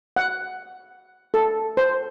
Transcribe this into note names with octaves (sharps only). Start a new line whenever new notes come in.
F#5
A4
C5